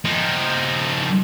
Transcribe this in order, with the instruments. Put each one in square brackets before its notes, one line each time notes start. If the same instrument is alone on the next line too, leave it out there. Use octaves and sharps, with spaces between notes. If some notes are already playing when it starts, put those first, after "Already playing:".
[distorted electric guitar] F3 D#4